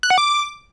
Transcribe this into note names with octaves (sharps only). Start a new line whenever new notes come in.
F#6
F#5
D6